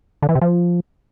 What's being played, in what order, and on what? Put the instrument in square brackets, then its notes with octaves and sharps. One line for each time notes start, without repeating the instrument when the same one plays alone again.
[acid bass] D3
E3
C3
F3